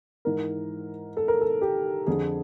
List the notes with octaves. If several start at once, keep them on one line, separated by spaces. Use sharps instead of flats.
G#2 E3 A#4
A4
A#4
A4
G4
F2 D3 G#4